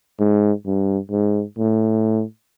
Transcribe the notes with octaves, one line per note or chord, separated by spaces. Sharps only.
G#2
G2
G#2
A2